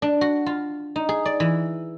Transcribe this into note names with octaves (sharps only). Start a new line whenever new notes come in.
D4
F#4
F4
D#4
G#4
D5
E3